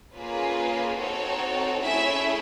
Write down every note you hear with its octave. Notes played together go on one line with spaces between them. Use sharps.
A#3 C#4 F4 G#4 B4
C4 D#4 F#4 A4 C#5
A3 C#4 E4 G#4 E5